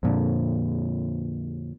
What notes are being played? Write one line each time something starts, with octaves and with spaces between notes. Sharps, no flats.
F2 A#2 D3